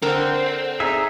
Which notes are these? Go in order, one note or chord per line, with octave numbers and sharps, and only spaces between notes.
D3 C4 A#4 C5 F#5
D#4 G#4 E5 A#5